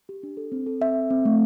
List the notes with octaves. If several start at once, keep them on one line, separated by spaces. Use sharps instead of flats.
G4
D4
A4
C4
A4
C4 E5
A4
C4
A3